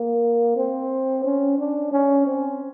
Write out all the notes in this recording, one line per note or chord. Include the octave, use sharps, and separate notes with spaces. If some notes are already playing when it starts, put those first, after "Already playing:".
Already playing: A#3
C4
C#4
D4
C#4
C4